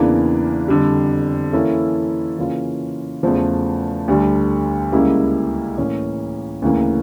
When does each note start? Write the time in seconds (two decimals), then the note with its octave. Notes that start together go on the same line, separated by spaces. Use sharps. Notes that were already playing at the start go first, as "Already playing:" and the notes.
Already playing: E2 C#3 E3 A#3 D4
0.68 F2 D3 G3
1.53 E3 A#3 C#4 E4 A4
2.38 C#3 E3 A#3 C#4 F4
3.23 E2 C#3 F3 A3
4.08 D2 D3 G3
4.92 C#2 C#3 G3 A#3 E4
5.78 A2 E3 A#3 C#4
6.62 D2 C#3 E3 A#3 C#4